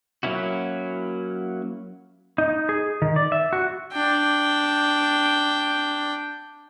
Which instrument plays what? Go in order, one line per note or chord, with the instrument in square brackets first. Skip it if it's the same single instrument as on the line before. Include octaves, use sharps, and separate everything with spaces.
[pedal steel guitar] F#3 A#3 C#4 E4 F#4
[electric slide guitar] D#4
G#4
D#3
D5
E5
F#4
[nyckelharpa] D4 G5